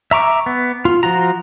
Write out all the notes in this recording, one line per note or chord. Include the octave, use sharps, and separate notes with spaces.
E5 A#5 C#6 D6
B3
F4
F3 F4 F#4 A#5